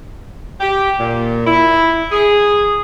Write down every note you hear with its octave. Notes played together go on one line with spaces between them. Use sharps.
G4
A#2
E4
G#4